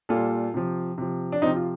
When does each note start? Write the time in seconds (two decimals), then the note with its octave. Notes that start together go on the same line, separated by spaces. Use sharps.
0.09 A#2 G3 F4 A4
0.54 C3 F3
0.98 C3 F3
1.32 D4
1.42 F3 C4 D#4
1.46 C3
1.56 F4